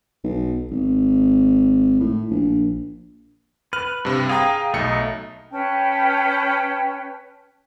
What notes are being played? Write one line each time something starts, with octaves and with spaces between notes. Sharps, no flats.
B1
G#1
A2
A#1
B4 F6
G2 C3
G#4 F5 G5 A#5
B1 A3 D#4 C#7
C#4 B4 G5 A5